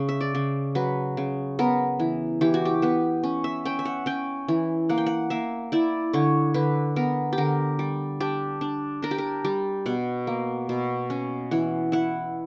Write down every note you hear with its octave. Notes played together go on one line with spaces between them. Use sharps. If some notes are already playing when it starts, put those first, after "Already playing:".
Already playing: C#3
E5
D5
C#3
F#3 B4
C#3
B3 A#4
E3
E3 G4
F#4
G4
B3 B4
C#4
E5
C#4 G5
E5
F#5
C#4 G5
E3
A#3 F#5
G5
F#5
A#3 E5
E4 D5
D3 C#5
D3 B4
B3 A#4
G4
D3 A#4
G3
D4 G4
D4
D4 A#4
G4
A#4
G3
B2 F#5
A#3
B2
C#4
E3 F#5
E4 F#5